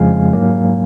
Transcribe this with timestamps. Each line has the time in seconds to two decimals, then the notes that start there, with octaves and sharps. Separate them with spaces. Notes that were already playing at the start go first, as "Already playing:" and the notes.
Already playing: F2 C#3 F3 G#3 F5 G#5
0.33 G#2 F#3 A#3